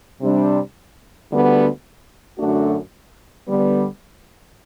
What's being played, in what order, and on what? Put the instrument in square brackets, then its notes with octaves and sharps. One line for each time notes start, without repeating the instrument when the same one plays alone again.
[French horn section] C3 G3 D4
D2 D3 G3 B3
F#2 D3 A3 D4 F#4
D3 G3 B3